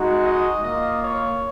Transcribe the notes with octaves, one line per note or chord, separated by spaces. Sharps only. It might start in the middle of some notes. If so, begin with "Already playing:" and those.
Already playing: G#3 D#4 F#4
D#5
A#3 F4 D#5
C#5